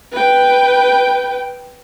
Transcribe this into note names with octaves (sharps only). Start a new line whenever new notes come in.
B4 G5